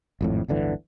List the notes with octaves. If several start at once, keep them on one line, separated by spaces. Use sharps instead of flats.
G#1 F2 A2
D1 G1 D3 E3